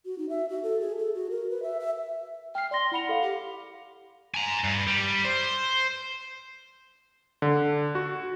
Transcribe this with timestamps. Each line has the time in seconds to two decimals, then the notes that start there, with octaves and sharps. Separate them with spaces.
0.06 F#4
0.18 D#4
0.29 E5
0.49 F#4
0.63 A4
0.80 G#4
0.98 A4
1.14 F#4
1.30 A#4
1.50 B4
1.63 E5
1.80 E5
2.55 G5 F6 C7
2.71 D5 C6 A#6
2.92 E4 F#5 B5 F7
3.09 A4 F5
3.22 G4
4.34 G#5 A#5
4.64 G2
4.87 G3
5.25 C5
7.42 D3
7.95 F#4